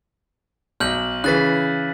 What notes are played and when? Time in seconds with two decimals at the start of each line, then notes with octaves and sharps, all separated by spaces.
0.80 B1 F6 G6 F#7
1.24 C#3 E3 F#6 A6 B6